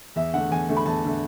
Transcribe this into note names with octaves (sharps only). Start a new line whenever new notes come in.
E2 E5
D3 A3 F#5
E2 G#5
D3 A3
B5
E2 A5
D3 A3